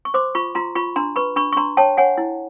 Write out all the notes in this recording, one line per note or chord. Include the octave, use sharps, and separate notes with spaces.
C#6
C5 C6 D6
F4 B5 C#6
F4 A#5 C6
F4 B5 C#6
D4 A#5 C6
B4 B5 C#6
D4 B5 C#6
C#6
D4 A#5 C6
C#5 G5 A5
C#5 F#5 G#5
E4